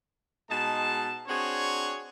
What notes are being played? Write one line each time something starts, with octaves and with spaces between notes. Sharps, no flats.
B2 G#3 D#4 A5
C4 D4 F#4 G#4 C#5